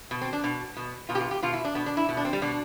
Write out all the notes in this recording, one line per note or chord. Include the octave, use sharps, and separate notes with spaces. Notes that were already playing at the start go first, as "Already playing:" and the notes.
B2
C4
D4
B2
B2
B2 F4
G4
F4
G4
B2 F4
E4
D4
B2 B3
D4
E4
B2 E4
D4
C4
G3
B2 D4